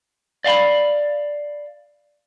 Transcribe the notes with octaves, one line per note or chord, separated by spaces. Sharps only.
D5 F5 G5 B5